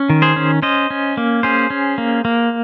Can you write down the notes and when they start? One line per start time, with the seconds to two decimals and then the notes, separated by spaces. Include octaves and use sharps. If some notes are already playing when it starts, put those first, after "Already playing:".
Already playing: C#4
0.10 D#3
0.22 G#4 C5
0.36 C#4
0.62 C#4 C5 D#5
0.90 C#4
1.17 A#3
1.43 C#4 G#4 C5
1.70 C#4
1.98 A#3
2.25 A#3